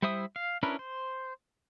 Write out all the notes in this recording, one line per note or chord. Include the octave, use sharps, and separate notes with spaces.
G3 E4 C5 E5 D#6
F5
C#4 D4 E4 A#4 B4
C5